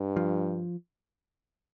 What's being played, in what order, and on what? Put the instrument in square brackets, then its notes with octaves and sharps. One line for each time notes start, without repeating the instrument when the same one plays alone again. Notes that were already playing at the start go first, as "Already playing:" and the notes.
Already playing: [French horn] G2
[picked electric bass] F3